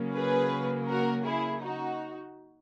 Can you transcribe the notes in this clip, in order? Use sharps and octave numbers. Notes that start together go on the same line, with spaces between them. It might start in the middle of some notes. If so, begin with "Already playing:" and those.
Already playing: C#3 F#3 A#3 C#4
G#4 B4
F#4 A#4
E4 G#4
D#4 F#4